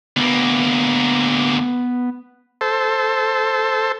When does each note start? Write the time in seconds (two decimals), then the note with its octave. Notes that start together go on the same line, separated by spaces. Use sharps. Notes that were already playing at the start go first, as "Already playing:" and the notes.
0.17 D2 A#3 B3
2.61 A4 C5